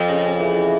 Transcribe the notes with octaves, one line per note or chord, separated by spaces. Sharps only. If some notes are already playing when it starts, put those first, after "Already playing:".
Already playing: F2
C#3
C#3
E3
E3